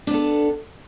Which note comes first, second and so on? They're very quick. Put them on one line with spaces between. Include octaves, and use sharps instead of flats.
D4 B3 A4